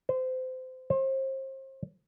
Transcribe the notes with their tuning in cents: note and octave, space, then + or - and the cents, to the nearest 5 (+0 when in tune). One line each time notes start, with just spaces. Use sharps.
C5 -25
C5 +35